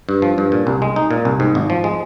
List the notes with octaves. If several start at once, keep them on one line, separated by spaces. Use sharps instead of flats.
G2
F3
G2
A#2
C2
G#3
D#4
A#2
C2
G#2
G#1
F3
G#3